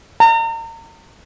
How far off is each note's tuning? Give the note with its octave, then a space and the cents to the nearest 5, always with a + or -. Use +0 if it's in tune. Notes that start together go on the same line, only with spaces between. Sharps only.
A#5 -35